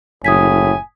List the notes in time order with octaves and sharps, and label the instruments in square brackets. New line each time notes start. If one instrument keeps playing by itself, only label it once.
[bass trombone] F#1 [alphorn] A2 [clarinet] G#5 [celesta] D#6 G#6 B6